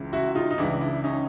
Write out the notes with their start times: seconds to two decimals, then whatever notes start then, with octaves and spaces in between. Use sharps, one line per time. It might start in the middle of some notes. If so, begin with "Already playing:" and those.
Already playing: C#2 C#3 E3
0.13 E4 F#4
0.35 D#4 F4
0.51 D#4
0.58 C#2 C#3 E3 D4 E4
0.81 D4 E4
1.04 C#4 D#4